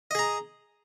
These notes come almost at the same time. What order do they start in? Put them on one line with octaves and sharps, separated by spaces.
D#5 G#4 A#5